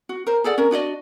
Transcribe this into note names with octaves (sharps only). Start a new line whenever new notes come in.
F#4
A#4 C5
G#4 A4 D5 F#5
C#4 A#4
D4 F#4 D5 D#5